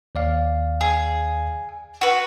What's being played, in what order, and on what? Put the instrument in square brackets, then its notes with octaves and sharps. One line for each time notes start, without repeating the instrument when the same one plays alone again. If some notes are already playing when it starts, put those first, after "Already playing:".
[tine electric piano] D#2 D5 F5
[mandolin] G#4
F#4 B4